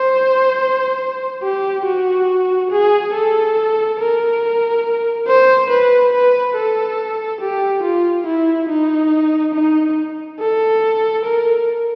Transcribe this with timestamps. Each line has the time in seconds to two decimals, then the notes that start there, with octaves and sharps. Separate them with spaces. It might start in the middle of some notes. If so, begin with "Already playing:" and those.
Already playing: C5
1.43 G4
1.86 F#4
2.71 G#4
3.14 A4
4.00 A#4
5.28 C5
5.70 B4
6.13 B4
6.56 A4
7.41 G4
7.83 F4
8.26 E4
8.69 D#4
9.54 D#4
10.39 A4
11.25 A#4